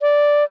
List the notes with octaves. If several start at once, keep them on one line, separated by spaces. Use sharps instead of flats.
D5